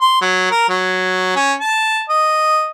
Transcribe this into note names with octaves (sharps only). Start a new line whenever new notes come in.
C6
F#3
A#4
F#3
C#4
A5
D#5